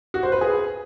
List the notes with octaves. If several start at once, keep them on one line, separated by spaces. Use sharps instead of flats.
F#4
C5
B4
G#4